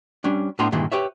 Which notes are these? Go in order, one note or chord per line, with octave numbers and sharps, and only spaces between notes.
G3 C#4 D4
A2 B3 D4 A#5 C6
G2 A#2 D#3 E3 G#3
G4 B4 C#5 E5